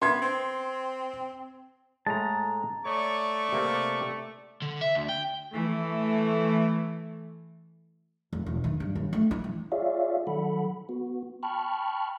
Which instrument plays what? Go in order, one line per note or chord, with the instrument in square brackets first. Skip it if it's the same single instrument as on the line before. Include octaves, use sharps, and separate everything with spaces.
[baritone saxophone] B3 [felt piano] C6 G#6
[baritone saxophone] C4
[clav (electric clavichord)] A2 G#3 [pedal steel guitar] A5 A#5
[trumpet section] A3 D5 C#6 [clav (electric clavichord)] C#5
[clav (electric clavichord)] C3 A#3 C4
[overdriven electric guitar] D3
E5
D2
G5
[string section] E3 A3
[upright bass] F1
E1
D#3
G2
D#2
A3
E4
E3
[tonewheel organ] F4 G#4 C#5 D5 E5 F5
D#3 F#3 A4 F#5 B5
B3 F#4
G5 A5 B5 C#6 F6 F#6